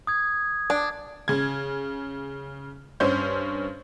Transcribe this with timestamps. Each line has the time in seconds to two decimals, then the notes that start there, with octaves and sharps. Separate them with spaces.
0.07 D#6 G#6
0.70 D4
1.28 C#3 G#6
3.00 G2 C#4 C5 C#5 G6